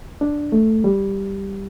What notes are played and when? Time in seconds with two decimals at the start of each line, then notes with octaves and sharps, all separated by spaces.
0.21 D4
0.52 A3
0.84 G3